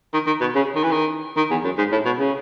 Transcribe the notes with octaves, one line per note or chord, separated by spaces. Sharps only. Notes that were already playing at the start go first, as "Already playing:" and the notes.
D#3
D#3
B2
C#3
D#3
E3
D#3
D#3
E2
F#2
G#2
A2
B2
C#3